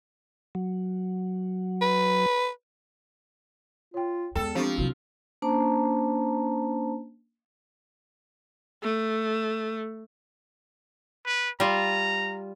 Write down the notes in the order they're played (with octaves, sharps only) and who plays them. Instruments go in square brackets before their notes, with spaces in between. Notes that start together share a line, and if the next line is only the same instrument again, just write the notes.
[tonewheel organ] F#3
[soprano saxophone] B4
[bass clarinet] F4 [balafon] C#5 G5
[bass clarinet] E2 [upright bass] G#3 B3 [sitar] A4 [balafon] G5
[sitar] F3 [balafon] C4 D4 C#6 [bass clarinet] G4
[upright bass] C3 F#3 [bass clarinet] E4 [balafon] F#4
[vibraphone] A#3 C#4 D4 C5 A5 A#5
[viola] A3
[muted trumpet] B4
[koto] G3 F4 [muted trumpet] A#5